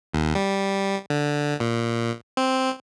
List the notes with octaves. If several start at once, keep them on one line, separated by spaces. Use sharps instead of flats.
D#2
G3
D3
A#2
C4